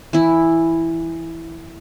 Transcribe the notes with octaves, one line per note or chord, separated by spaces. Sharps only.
E3 E4